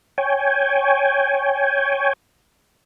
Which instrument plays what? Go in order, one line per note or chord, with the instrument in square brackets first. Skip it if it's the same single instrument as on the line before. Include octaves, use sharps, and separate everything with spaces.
[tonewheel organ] C#5 G5 G#5